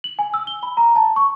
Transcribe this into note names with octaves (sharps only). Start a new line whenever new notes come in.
F#7
G#5
E6
G7
B5
A#5
A5
C#6